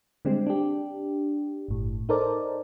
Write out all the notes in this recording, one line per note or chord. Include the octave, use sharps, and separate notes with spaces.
D3 G3 G#3 C4
D4 G4
G1 A2
D#4 A4 A#4 C5 D5